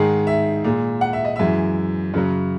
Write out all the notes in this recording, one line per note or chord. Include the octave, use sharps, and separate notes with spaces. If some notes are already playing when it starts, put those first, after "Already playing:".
Already playing: G#2 D#3 G#3 G#4
E5
A#2 G#3
F#5
E5
D#5
F#2 E3 G#3 E5
F#2 C#3 F#3